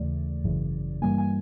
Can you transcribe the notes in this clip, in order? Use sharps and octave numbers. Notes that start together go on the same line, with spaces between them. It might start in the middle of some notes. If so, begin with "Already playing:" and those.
Already playing: D#2 C#3 E3 A3 D5
G#1 F#2 C#3 E3
G2 E3 G3 A#3 G#5
G#5